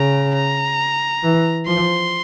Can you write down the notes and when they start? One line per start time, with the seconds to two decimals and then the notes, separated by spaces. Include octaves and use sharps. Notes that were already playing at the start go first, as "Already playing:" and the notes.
Already playing: C#3 A#5
0.35 A#5
1.23 E3
1.67 F3 C6